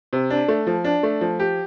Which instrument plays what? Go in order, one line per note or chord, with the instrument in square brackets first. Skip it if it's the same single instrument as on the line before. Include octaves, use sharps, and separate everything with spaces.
[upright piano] C3
D4
A3
F3
D4
A3
F3
G4